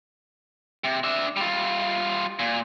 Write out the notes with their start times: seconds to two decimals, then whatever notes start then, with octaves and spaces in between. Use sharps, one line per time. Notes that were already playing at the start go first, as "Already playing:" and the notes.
0.84 C3
1.04 D4 E5
1.37 G3 F4
2.39 A#2